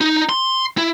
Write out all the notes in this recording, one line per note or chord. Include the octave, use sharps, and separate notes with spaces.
D#4
C6
E4